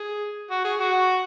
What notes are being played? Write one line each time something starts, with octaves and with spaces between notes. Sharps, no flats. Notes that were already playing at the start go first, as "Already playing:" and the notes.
Already playing: G#4
F#4
G#4
F#4